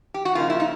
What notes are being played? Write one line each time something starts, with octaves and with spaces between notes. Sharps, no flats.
G4
F#4
C#3 F3 A#3 D#4 F4
E4
D#4